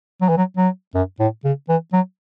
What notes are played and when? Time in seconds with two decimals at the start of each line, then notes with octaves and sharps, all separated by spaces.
0.21 F#3
0.29 E3
0.37 F#3
0.57 F#3
0.95 F#2
1.20 A2
1.44 C#3
1.69 E3
1.93 F#3